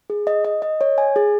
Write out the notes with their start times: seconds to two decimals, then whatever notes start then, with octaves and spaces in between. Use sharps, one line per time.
0.10 G#4
0.27 D#5
0.45 D#5
0.62 D#5
0.81 C#5
0.98 G#5
1.16 G#4